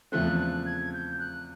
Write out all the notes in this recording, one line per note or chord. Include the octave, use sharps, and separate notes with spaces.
E2 C#3 F3 A3 C4 F#6
F#6
G#6
G6
F#6